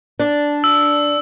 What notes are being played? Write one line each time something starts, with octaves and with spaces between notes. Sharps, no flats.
D4
E6